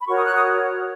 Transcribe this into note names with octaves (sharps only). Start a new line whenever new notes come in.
B5
F#4 A#4 C#5 C#6
D#6
F#6
D#6